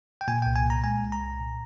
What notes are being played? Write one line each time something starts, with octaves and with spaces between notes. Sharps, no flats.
G5
A#2 G#5
C2 G5
G#5
A#2 A#5
G#3 G#5
C2
A#5
C2
A#2